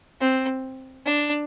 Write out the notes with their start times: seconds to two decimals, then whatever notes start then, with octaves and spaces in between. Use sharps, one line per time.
0.21 C4
1.05 D4